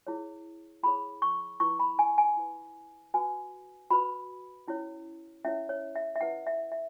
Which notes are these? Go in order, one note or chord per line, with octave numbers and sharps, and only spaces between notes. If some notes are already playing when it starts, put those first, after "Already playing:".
E4 G#4 C#5
E4 G#4 C#5 B5
C#6
E4 B4 C#6
B5
G#5
G#5
E4 B4
F#4 B4 G#5
F#4 B4 B5
C#4 E4 C#5
C#4 E4 C#5 E5
C#5
E5
E5
E4 B4 F#5
E5
E5